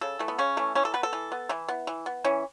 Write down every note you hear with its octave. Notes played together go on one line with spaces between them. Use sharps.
C#3 A4
E3 A3
B3
C#3 C#4
E3 A3
E3 C#4
A4
B3 B4
A4
E3
B3
E3 E4
B3
E3
B3
E3 C#4